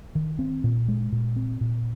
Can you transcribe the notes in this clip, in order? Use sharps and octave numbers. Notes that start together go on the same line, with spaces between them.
D#3
C4
A#2
G#3
A#2
C4
A#2